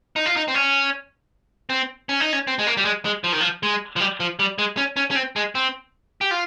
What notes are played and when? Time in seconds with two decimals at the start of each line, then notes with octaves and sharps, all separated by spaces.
0.16 D#4
0.26 F4
0.36 D#4
0.48 C4
0.54 C#4
1.70 C4
2.09 C#4
2.20 D#4
2.33 C#4
2.47 C4
2.59 G#3
2.67 A#3
2.77 G3
2.85 G#3
3.05 G#3
3.24 F3
3.32 D#3
3.40 F3
3.63 G#3
3.96 F3
4.00 G3
4.20 F3
4.39 G3
4.59 G#3
4.77 C#4
4.96 C#4
5.11 C#4
5.15 C4
5.36 G#3
5.55 C4
6.21 G4
6.31 F4